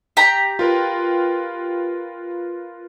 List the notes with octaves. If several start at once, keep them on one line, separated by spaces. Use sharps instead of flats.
G4 A#5
F4 A#4 B4